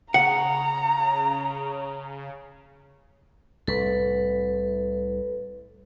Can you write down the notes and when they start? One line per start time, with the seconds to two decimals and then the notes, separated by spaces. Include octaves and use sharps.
0.14 C#3 F#5 A#5
3.67 C2 A2 A4 B4